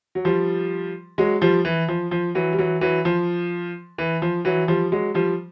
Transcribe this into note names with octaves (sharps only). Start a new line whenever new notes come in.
F#3
F3 G3
F#3 G#3
F3 G3
E3
F3
F3
E3 F#3
G3
E3 F#3
E3 F#3
F3
E3
F3
E3 F#3
F3 G3
F#3 G#3
F3 G3